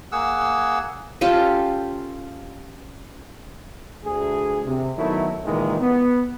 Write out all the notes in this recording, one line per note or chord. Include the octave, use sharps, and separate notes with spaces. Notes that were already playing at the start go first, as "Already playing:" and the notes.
A#3 G#4 F#5 E6
C#4 F4 G4 A4
D2 G#4
C3
D#3 F#3 A3 B3 E4
C#2 A#2 D#3 E3 G#3
B3